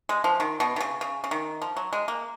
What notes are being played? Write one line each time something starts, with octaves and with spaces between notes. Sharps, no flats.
G#3
F3
D#3
B2
D#3
C#3
C#3
C#3
D#3
F3
F#3
G#3
A#3